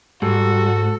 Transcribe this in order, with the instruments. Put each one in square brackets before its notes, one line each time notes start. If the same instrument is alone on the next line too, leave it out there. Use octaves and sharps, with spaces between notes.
[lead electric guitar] G#2 [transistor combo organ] G3 [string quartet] F#4 [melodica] A4